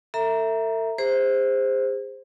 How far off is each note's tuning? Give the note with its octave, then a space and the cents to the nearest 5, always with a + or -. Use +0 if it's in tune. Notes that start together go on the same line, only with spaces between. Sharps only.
A4 +40 E5 +0 A#5 +5
G#4 -40 C5 +0